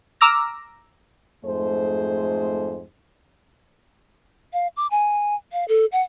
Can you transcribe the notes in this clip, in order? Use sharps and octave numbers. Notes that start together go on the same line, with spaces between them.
A#5 D6 E6 F6 A#6
F2 G#2 A3 G#4 C5
F5
D6
G#5
F5
A4
F#5